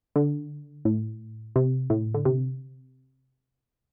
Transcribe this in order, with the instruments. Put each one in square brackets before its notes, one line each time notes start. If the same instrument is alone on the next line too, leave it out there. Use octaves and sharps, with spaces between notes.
[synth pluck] D3
A2
C3
A2
D3
C3